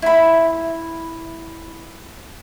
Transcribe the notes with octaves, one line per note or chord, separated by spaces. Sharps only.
E4 B5